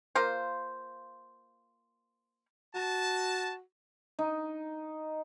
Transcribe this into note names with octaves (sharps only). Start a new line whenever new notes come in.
A#3 F4 C5
F#4 A5
D#4